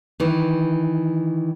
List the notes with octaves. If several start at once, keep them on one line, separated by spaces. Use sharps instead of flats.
D#3 E3